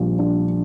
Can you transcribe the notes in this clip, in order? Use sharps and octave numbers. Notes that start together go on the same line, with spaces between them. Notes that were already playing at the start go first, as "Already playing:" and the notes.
Already playing: A#1 A#2 G3
D4